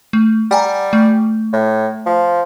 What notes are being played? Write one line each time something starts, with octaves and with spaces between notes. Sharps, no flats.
A3
G3 F#5 G#5 A#5
A3
A2
F3